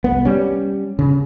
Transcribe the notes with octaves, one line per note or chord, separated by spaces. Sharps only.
C2 B3
G3 C#4
C#3